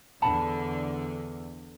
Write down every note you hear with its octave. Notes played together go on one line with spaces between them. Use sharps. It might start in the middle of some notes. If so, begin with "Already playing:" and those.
E2 D3 F#5 A5 B5